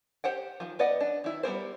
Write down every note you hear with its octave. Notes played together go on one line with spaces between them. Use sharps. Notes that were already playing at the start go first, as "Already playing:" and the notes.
G4 C5 F#5 G5
D#3 F3
B3 B4 D5 D#5 F#5
D4
D#3 E4
G3 B3 A#4 C5